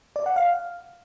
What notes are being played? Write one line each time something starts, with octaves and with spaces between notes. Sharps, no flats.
D5
F#5
F5